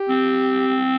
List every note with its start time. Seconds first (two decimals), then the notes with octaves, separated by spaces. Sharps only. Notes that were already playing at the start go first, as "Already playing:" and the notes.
Already playing: G4
0.09 C4